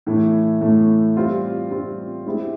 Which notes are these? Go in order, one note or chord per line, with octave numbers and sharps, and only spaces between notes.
A2 E3 A3
A2 E3 A3
G3 C4 F4
G3 C4 F4
G#3 C4 E4 G4